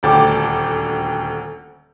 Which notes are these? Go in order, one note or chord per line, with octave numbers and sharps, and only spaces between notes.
D#1 D2 A4 G5 D6